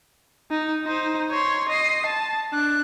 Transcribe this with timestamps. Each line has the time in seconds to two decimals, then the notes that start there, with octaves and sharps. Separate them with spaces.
0.51 D#4
0.84 D#4 C5
1.31 C#5 C6
1.69 D#5 C7
2.06 A5
2.53 D4 F#6